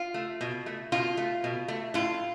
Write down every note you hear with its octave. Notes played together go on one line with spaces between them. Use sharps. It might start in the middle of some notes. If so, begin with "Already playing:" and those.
Already playing: F4
A3
B2
A3
B2 F4
A3
B2
A3
A2 F4